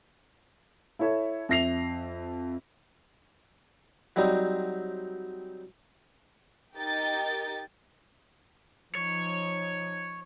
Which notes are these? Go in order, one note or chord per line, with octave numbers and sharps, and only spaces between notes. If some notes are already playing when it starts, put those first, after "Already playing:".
E4 A4 C#5 E5
F2 E5 A#6 C7 F7
F#3 G3 C4 D#4
D#4 G4 A#4 D#5 G5 A6
F3 D#4 C#5